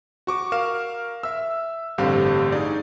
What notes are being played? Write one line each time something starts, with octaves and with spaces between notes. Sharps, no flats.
F#4 C#6 D6
A#4 F5 F6 E7
E5 E6
A1 G2 D3 C4 G4 F5
D#4 G#4 D5